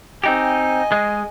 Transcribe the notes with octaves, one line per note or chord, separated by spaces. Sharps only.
C4 D#4 G4 D#5 G#5
G#3